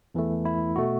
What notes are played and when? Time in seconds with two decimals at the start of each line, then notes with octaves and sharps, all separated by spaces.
0.14 E2 E3 A3
0.45 E4
0.76 B2 A3 F#4